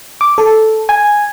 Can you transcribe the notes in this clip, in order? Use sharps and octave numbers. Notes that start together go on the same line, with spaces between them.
D6
A4
G#5